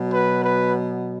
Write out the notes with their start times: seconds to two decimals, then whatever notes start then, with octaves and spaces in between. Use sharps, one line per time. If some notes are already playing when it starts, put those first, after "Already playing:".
Already playing: B2 F#3
0.13 B4
0.44 B4